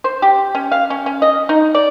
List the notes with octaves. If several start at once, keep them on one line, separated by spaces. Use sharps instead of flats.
C5
G4
C#4
F5
C#4
C#4
D#5
D#4
D5